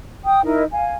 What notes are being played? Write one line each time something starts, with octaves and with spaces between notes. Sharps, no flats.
G5 D#6
D#4 E4 A#4 D#5
F5 G#5